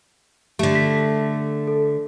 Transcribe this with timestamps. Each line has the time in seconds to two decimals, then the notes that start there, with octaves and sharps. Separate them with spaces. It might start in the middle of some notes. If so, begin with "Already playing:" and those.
0.59 D3 A3 G4
0.75 B6
1.68 A4